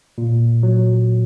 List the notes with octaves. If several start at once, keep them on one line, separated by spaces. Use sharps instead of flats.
A#2
F#3